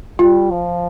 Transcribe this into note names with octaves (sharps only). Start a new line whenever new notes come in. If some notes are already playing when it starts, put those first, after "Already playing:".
G3 F4
F3